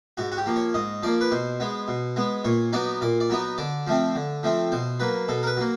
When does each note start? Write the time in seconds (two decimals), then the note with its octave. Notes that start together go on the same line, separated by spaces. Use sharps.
0.17 G#2 F#4
0.32 F#4
0.37 G4
0.46 F3 A#3
0.56 C#5
0.74 G#2 D#5
1.03 F3 A#3 D5
1.21 B4
1.31 B2 C5
1.60 G#3 B3
1.88 B2
2.16 G#3 B3
2.44 A#2 C#5
2.73 F#3 B3 D#4 D5
3.01 A#2 D5
3.20 D5
3.30 F#3 B3 D#4
3.58 D3 D5
3.87 F3 A3 C4
4.15 D3
4.43 F3 A3 C4
4.72 B2 C5
5.00 F#3 A#3 B4
5.28 B2 A4
5.43 A#4
5.47 B4
5.57 F#3 A#3